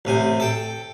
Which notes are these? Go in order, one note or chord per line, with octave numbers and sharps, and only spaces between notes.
A1 C3 G#5
A4 G5